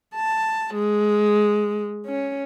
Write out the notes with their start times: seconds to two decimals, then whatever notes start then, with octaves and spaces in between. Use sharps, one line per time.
0.15 A5
0.75 G#3
2.06 C#4